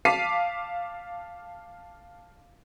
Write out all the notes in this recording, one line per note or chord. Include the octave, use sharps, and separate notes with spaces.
F5 A5 D6 B6 C7 D#7